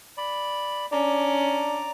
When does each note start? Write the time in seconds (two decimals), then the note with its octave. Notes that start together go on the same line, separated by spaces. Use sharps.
0.17 D5 B5
0.92 C#4 D4 D5 A#5 D6